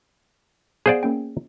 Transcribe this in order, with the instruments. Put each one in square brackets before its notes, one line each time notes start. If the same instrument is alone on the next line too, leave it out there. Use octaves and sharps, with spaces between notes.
[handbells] B3 F5 F#5 [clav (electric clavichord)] G#4 C5 D5
[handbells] A#3 C#4 G5